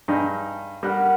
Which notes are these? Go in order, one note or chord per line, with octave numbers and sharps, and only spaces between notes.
G2 D#4 G#4
G3 A#4 F#5